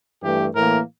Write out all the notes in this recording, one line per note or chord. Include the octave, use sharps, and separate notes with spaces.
G2 E3 A3 G4
A2 E3 A#3 A#4